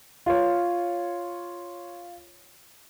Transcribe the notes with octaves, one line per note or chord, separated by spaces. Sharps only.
F4 C#5